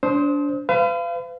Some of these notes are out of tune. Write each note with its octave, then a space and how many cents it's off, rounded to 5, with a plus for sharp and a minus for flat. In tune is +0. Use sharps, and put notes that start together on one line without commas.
D4 -30 C5 +0 D#6 +40
B4 +40 F5 -30